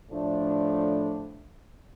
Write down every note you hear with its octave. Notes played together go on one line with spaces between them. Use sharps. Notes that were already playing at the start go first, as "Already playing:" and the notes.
A2 F3 A3 D4